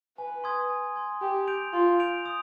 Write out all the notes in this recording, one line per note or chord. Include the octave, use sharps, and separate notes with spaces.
B4 G#5
C6 D#6 G#6
G#5
C6 D#6 G#6
G4 C6
G6 D7 F7
F4 C6
G6 D7 F7
D#6